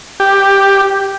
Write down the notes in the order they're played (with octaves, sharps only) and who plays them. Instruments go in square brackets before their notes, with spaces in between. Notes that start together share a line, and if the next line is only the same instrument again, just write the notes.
[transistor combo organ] G4